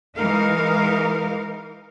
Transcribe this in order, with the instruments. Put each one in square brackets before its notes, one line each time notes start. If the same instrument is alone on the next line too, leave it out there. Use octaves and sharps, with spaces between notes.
[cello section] E3 G#3 D#4 A#4 F5